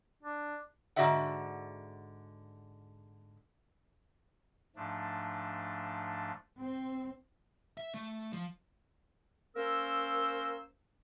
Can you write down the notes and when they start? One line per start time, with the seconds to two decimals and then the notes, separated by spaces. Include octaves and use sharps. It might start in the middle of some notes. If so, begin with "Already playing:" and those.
0.23 D4
0.96 G#2 D3 F#4 D5 E5 F#5
4.76 G#2 F3 A3 D4
6.60 C4
7.78 E5
7.94 A3
8.33 F3
9.56 A#3 C#4 A#4 C5 E6